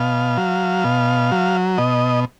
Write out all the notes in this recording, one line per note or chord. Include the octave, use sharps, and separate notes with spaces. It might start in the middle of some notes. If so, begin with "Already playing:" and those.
Already playing: B2 F5
F#3
B2
F#3
B2 D#5